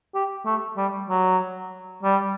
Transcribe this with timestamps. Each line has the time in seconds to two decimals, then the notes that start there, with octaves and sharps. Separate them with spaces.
0.15 G4
0.46 A3
0.77 G3
1.09 F#3
2.03 G3